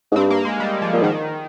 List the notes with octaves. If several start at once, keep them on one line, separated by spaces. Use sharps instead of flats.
G#2
G2 C4
A#3
G#3
G3
F3
A#2
G#2 D#3